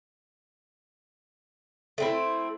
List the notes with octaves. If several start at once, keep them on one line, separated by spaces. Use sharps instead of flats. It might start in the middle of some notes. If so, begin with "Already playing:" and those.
A3 C4 E4